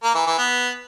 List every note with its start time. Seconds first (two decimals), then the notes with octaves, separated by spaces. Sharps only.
0.03 A#3
0.15 E3
0.27 E3
0.38 B3